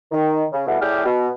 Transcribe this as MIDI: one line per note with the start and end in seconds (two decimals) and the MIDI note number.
0.11 0.43 51
0.53 0.64 49
0.67 0.78 47
0.67 0.78 55
0.67 0.78 57
0.67 0.78 64
0.67 0.78 66
0.80 1.02 45
0.80 1.02 67
0.80 1.02 68
0.80 1.02 74
0.80 1.02 76
0.80 1.02 89
1.05 1.29 47